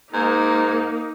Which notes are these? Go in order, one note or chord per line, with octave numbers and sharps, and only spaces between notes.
G#2 A#3 D#4